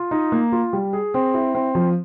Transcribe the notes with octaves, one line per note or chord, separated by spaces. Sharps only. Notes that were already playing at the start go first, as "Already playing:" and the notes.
Already playing: F4
D#4
A#3
F4
G3
G#4
C4
E4
C4
F3